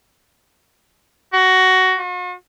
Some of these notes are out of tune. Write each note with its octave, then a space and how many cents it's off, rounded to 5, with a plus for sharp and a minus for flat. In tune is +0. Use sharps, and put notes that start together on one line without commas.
F#4 +15
F#4 -45